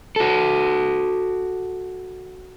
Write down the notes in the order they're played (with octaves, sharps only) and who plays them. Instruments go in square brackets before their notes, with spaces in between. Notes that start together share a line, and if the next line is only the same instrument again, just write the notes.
[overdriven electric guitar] F#4 A4